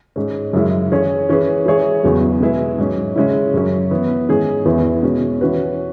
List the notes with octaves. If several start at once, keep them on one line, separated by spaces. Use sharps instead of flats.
G#2 G#3 C#4
F#2 C#3 G#3 E4
E3 C#4 G#4 C#5
E3 C#4 G#4 B4
E3 G#3 E4 G#4 C#5
E2 C#3 F#3 B3
B2 G#3 E4 G#4 B4
G#2 F#3 C#4
C#3 G#3 C#4 E4
F#2 C#3 F#3 C#4
E3 B3 E4
G#2 E3 C#4 G#4
E2 E3 B3 E4 B4
B2 G#3 C#4
E3 C#4 F#4 B4